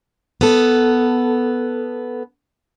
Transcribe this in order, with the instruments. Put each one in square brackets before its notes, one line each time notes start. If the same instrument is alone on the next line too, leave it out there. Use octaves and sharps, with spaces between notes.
[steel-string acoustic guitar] B3 A4